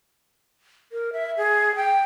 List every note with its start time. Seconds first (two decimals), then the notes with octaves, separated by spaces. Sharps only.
0.92 A#4
1.13 E5
1.37 G#4
1.75 G5